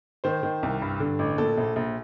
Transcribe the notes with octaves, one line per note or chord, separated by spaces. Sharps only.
D#3 C5
D#3
C2
G2
D3
A1
A#2 A4
A#1
A#1